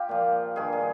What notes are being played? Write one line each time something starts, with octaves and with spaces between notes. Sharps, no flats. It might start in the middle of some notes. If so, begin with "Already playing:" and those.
Already playing: F4 G4
A#2 F3
G2 D#3 G#4
G#4